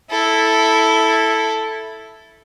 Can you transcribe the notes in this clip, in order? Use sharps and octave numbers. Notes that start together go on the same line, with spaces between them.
E4 A4